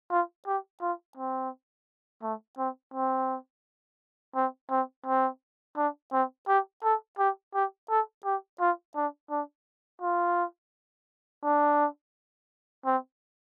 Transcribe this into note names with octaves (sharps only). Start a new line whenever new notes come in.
F4
G4
F4
C4
A3
C4
C4
C4
C4
C4
D4
C4
G4
A4
G4
G4
A4
G4
F4
D4
D4
F4
D4
C4